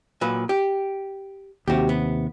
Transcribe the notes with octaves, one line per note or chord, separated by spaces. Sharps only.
A#2 F#3 B4
G4
D#2 C3 F#4 G4
B3